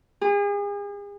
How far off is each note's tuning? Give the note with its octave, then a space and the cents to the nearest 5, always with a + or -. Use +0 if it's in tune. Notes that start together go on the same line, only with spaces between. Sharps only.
G#4 -40